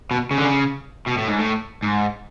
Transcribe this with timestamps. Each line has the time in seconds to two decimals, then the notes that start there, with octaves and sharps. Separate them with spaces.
0.11 B2
0.31 C#3
0.38 D3
0.44 C#3
1.06 B2
1.17 A2
1.27 G#2
1.39 A2
1.83 G#2